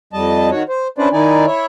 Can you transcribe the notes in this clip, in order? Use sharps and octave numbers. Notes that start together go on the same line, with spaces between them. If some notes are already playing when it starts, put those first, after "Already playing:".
F2 G3 D#5 A5
D#3 F#4 C#5
C5
C#4 D4 E4 B4 C5 D5
D#3 D#4 E4 D5 G#5
E4 C#5 E5